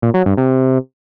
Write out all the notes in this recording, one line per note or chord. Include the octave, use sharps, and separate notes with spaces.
A#2
F#3
G2
C3